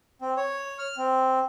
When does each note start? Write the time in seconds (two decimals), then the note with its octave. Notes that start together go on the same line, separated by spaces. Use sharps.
0.21 C4
0.37 C#5
0.79 F6
0.97 C4